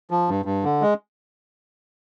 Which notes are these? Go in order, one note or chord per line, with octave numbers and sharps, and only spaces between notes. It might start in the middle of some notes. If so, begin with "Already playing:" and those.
F3
G2
G2
D3
G#3